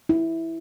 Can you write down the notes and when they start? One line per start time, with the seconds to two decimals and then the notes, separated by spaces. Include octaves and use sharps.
0.09 E4